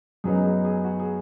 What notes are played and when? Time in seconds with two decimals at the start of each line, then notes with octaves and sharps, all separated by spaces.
0.24 F#2 F#3 B3 D#4 G#4
0.44 G#4
0.65 G#4
0.84 F#4
0.99 G#4